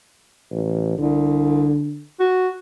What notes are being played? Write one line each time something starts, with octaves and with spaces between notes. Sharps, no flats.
A1
C2 D3
F#4